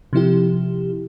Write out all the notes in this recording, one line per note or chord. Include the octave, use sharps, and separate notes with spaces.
C3 F3 E4 G4